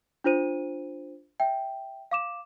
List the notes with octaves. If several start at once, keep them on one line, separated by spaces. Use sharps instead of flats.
D4 F4 C5 D#7
E5 G5
F5 D6 E7